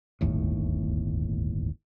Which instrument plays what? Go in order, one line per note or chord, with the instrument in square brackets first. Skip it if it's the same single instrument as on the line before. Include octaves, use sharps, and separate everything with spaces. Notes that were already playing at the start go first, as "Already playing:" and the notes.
[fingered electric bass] D1 G1 D#2 A2